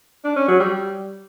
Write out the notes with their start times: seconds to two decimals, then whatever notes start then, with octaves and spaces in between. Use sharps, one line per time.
0.24 D4
0.36 C#4
0.48 F#3
0.60 G3